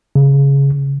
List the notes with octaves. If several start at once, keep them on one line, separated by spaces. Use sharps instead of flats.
C#3